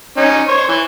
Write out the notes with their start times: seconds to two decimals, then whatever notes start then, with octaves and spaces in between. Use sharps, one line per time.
0.17 C#4 D#4
0.48 C5 C#5
0.69 E3